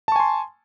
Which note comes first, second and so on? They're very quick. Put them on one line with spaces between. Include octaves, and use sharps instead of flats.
A5 C#6 G#5 C6